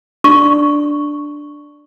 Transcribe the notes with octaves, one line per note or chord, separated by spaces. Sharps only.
D4 C#6